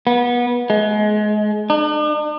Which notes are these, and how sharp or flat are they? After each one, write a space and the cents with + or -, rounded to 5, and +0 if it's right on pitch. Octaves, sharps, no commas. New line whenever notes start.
B3 -30
G#3 +30
D4 +45